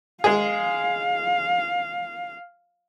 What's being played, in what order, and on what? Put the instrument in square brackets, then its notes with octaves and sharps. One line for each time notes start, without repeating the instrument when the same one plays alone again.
[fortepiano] G#3 G#4 [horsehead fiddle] F5